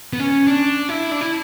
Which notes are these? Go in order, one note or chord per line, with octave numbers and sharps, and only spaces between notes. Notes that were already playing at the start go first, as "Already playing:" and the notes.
B3
C#4
D4
E4
D4
E4